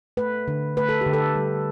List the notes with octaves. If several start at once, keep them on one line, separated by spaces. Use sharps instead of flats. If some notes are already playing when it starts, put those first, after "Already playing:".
A3 B4
D3
A3 B4
A4
D3 G4
A4
G3